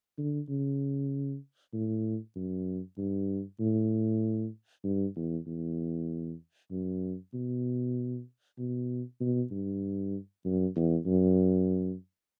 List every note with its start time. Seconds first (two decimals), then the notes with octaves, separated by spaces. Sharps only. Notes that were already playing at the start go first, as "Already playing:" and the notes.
0.18 D3
0.49 C#3
1.73 A2
2.36 F#2
2.98 G2
3.60 A2
4.84 G2
5.16 E2
5.46 E2
6.71 F#2
7.34 B2
8.58 B2
9.21 B2
9.51 G2
10.45 F#2
10.76 E2
11.06 F#2